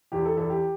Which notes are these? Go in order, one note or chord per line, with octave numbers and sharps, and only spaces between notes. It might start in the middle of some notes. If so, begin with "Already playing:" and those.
E2 G4
A4
E2 A4
G4